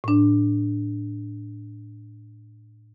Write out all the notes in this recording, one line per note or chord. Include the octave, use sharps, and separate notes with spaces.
A2 D4